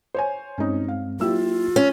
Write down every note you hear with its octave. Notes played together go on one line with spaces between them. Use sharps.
C5 C#5 G#5
G2 G#3 C4 C#4 D#4
F5
F#3 A#3 E4 F4 G4 E6
C#4